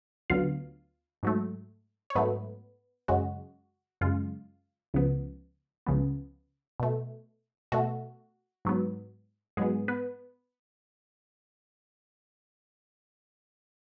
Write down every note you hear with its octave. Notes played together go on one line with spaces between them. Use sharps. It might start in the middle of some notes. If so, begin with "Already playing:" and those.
D2 D3 F#3 B3 F4 F5
G#2 F#3 A3
C#5
G#2 F#3 A3 B3 B4
F#2 C#3 G#3 F#4
F#2 C#3 G#3 F4
C#2 C#3 F3 B3
C#2 C#3 F3 B3
B2 A3
B2 A3 F#4
G#2 F#3 B3
G#2 F#3 G#3 B3 G#4
B3 B4